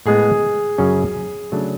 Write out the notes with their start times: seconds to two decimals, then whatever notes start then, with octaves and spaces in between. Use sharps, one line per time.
0.06 A2 G#3 B3 G#4
0.78 F#2 C#3 F#3 C#4
1.52 C#3 F#3 A3 D4